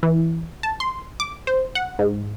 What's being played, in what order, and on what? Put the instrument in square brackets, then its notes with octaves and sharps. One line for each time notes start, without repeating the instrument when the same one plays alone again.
[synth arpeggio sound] E3
A5
C6
D6
C5
F#5
G#2